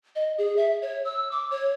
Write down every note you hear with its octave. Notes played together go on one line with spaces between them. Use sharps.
D#5
G#4
E5
C#5
E6
D6
C#5